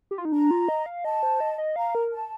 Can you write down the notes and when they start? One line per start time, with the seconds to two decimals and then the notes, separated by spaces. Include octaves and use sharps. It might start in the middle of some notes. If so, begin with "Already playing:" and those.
0.11 G4
0.18 F4
0.25 D#4
0.32 D4 A#5
0.51 F4
0.69 D#5
0.86 F5
1.05 D#5 A5
1.23 C5
1.40 D#5
1.58 D#5
1.76 F5 A#5
1.95 A#4
2.12 A5